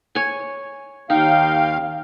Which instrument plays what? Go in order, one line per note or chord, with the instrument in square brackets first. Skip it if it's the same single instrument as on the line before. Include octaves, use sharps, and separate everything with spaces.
[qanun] C#5 G#5
[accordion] D#2 F5 [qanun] D#4 [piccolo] G5